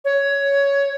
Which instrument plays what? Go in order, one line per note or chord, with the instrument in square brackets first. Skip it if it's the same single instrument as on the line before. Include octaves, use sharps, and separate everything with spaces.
[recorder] C#5